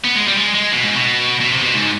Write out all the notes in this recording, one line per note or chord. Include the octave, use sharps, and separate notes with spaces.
B3
G#3
G3
G#3
G#3
B2
G#2
B2
B2
C3
B2
G#2